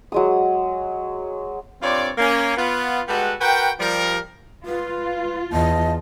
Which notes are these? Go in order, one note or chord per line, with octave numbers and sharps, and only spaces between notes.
F#3 G#3 D#6
G2 C4 F4 C#5 D5
A#3 C#4
B3 F4
G3 G#3 B3 F#4 A4 B4
F#4 A#4 B4 G5
F3 G3 A#4
F4 B4
E2 D#5 A5